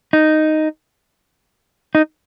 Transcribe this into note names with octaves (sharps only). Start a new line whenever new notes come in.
D#4
D#4